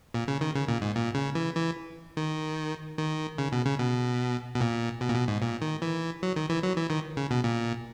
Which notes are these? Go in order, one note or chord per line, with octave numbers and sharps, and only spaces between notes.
A#2
C#3
D#3
C#3
A#2
G#2
A#2
C#3
E3
E3
D#3
D#3
C#3
B2
C#3
B2
B2
A#2
B2
A#2
B2
G#2
A#2
D#3
E3
F#3
D#3
E3
F#3
E3
D#3
C#3
B2
A#2